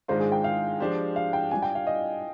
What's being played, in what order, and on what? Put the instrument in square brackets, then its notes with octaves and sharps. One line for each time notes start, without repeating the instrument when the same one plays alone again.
[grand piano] G#2 D#3 G#3 D4 F4 [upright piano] C5
[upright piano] G#4
G5
F5
[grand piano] F3 G#3 D4 G4 C5
[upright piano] F5
G5
[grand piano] G3 D4 F4 [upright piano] G#5
[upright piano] G5
F5
D#5